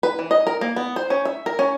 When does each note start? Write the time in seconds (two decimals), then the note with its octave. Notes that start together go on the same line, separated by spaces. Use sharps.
0.03 B4
0.19 E3
0.31 D#5
0.47 A#4
0.61 A#3
0.76 B3
0.96 C5
1.10 C#4
1.25 E5
1.46 A#4
1.59 C#4